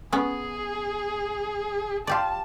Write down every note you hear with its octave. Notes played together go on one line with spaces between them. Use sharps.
B3 C#4 G#4
F4 G4 D5 A5